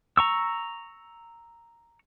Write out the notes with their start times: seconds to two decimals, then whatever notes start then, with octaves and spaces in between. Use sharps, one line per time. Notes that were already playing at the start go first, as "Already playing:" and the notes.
0.17 A#5 C#6 E6